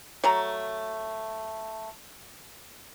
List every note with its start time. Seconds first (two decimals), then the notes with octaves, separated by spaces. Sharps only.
0.24 F#3 A3 A#5